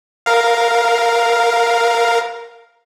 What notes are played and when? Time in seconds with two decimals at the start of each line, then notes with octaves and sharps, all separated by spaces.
0.26 A#4 F5